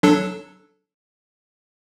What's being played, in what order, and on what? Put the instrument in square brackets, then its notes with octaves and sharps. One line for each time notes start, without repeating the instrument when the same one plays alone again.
[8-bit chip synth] F#3 D4 A4